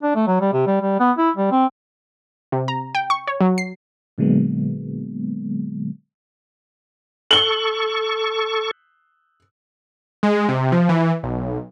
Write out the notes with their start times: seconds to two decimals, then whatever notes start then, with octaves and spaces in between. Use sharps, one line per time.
0.03 D4
0.15 A3
0.27 F#3
0.41 G3
0.52 C3
0.67 G3
0.81 G3
1.00 B3
1.18 E4
1.36 G3
1.51 C4
2.52 C3
2.68 A#5
2.95 G5
3.10 C#6
3.27 C#5
3.41 F#3
3.58 C7
4.18 A#2 D3 F#3 G#3 A#3 B3
7.31 A4 C#6 F#7 G7
10.23 G#3
10.49 C3
10.72 F3
10.89 E3
11.23 B1